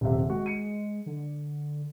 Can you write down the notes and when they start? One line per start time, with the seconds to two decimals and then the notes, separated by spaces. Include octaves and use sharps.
0.01 D#1 C3 E5
0.30 G#3 F#4
0.46 C#7 D#7
1.06 D3